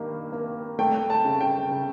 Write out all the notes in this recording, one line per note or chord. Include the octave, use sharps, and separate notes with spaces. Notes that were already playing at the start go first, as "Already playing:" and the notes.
Already playing: G2 D#3 A#3
A#3
A3 G5
A5
C#3
G5
C#3